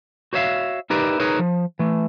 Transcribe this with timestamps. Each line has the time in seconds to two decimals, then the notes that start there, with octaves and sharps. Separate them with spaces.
0.33 F#4 C5 C#5 E5 F5
0.90 D#4 E4 G4 A#4 B4 D5
1.20 D#4 G#4 A#4 B4 C#5
1.39 F3
1.79 E3 A3